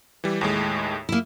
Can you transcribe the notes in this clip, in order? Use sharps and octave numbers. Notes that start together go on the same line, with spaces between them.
E3 G3
D#2 A2 G#3
A#3 E4